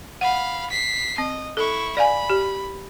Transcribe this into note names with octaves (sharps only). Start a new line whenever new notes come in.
F5 F#5 B5
B6 C7
C4 D#5
E4 A4 C#6
D5 F5 G#5 B5
G4